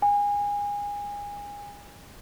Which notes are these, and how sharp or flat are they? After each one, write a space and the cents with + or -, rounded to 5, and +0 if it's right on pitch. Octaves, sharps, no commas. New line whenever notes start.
G#5 -25